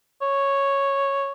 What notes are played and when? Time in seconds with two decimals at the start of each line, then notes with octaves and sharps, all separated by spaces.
0.22 C#5